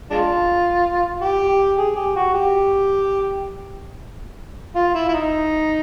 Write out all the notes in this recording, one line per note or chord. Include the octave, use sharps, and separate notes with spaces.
G#3 D4 F4
G4
G#4
G4
F#4
G4
F4
E4
E4
D#4